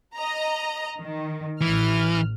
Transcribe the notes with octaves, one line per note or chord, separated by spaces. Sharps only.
D#5 A#5
D#3
A1 E3 F6